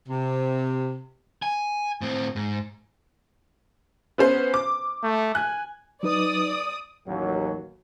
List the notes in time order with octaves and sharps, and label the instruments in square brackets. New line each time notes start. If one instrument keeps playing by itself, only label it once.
[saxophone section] C3
[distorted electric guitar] G#5
A2 C4
G#2
[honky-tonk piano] B3 C#4 C5
D6
[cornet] A3
[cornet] G#5 [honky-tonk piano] F#6
[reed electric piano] F#3 D#4 B4 [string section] D5 D#6
[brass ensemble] A1 D#2 F#3